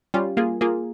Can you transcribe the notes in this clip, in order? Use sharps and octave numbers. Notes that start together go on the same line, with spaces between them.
G3 C#4 F4
A#3 F4 G#4
A#3 F4 G#4